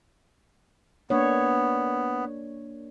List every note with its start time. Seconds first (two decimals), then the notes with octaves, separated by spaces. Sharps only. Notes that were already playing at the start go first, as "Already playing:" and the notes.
1.10 A#3 B3 D4 C#5